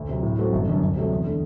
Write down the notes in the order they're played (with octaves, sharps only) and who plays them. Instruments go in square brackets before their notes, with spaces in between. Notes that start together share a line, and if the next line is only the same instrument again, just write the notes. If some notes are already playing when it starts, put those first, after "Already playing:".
Already playing: [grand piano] D2
C3 F#3
A2
F#3 A3 C4 F#4
G1
F#2 D3
D2
C3 F#3 A3
E2
D3 A3